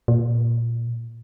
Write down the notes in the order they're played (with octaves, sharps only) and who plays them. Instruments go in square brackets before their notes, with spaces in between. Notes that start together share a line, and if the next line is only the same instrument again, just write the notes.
[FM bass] A#2